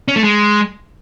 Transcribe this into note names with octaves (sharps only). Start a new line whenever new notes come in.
C#4
A3
G#3